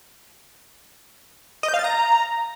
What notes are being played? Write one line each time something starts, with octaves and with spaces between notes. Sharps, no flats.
D#5
G6
F5
A6
A#5